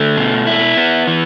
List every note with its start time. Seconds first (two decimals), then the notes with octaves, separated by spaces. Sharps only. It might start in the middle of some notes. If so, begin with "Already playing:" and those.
Already playing: D3 A3
0.17 B2
0.47 E4
0.77 B3
1.07 E3